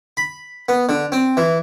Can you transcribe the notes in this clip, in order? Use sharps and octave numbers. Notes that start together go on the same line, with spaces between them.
B5
B3
D3
C4
E3